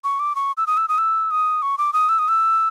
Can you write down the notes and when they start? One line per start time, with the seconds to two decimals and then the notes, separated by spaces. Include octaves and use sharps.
0.04 C#6
0.19 D6
0.35 C#6
0.57 E6
0.67 D#6
0.77 E6
0.88 D#6
0.98 E6
1.31 D#6
1.62 C#6
1.78 D6
1.93 D#6
2.09 E6
2.19 D#6
2.28 E6